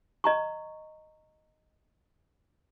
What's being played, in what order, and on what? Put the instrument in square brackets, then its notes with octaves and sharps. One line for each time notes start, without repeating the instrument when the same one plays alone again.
[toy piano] D#5 A#5 C#6